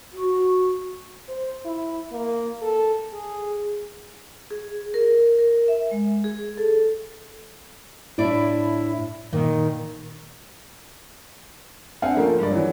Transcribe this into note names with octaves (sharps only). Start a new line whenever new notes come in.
F#4
C5
E4
A#3
A4
G#4
G#4
A#4
A#4
E5
G#3
G#4
A4
A2 D4 E4 D5
A#2 D#3
C4 D4 F5 F#5 G#5
C#3 F3 A3 A#3 A#4
G2 G#3 D5
E3 F#3